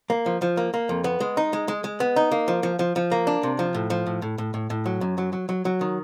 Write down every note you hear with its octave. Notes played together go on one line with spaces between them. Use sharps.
A#3
F3
F3
A#3
A#3
F2
B3
G#3
D#4
G#3
G#3
G#3
B3
D#4
A#3
F3
F3
F3
F3
A#3
D4
C3
F3
A2
F3
A2
A2
A2
A2
A2
F#3
F#2
F#3
F#3
F#3
F#3
D#3